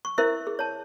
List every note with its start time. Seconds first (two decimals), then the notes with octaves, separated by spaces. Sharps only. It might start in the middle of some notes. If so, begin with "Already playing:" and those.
0.05 C#6
0.18 E4 A#4 C5 E5
0.47 G#4
0.59 C#5 A5